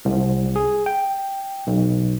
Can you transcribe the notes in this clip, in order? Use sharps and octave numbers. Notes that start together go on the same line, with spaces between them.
C2
G#4
G5
B1